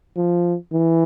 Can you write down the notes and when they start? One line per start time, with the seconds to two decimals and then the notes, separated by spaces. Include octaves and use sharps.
0.17 F3
0.72 E3